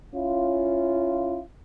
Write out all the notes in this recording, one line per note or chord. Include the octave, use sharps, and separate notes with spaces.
C#4 E4 F4